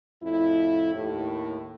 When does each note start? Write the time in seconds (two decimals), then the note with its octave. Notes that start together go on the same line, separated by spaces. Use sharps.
0.22 F2 A2 E4
0.94 D#2 A2